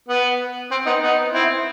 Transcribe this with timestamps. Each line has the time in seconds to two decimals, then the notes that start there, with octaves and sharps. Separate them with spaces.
0.08 B3
0.71 C4
0.86 B3 D#4
1.02 B3 D#4
1.33 C4 E4